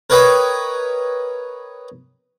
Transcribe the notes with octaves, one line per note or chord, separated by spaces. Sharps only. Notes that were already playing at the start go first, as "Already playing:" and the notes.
A#4 B4 C#5 D#5 G5 B5